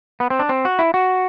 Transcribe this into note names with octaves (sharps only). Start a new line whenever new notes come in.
B3
C4
D4
C4
F#4
E4
F#4